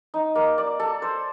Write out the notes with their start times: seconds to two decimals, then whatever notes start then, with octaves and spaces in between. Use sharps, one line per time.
0.14 D#4
0.35 A#3
0.58 D5
0.80 A4
1.02 C5